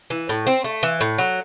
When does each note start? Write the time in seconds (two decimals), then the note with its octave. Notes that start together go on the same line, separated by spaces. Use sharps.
0.10 E3
0.29 A2
0.47 C4
0.64 A3
0.83 E3
1.01 A2
1.18 F#3